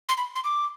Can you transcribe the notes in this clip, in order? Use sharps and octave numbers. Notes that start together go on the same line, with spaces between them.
C6
B5
C6
D6